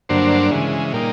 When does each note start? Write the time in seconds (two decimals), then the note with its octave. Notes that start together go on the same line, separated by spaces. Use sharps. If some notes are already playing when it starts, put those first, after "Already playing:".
0.09 G2 D3 F#3 A#3 D4 C5
0.51 C#3 E3 G#3
0.93 A#2 G3 A#3 D#4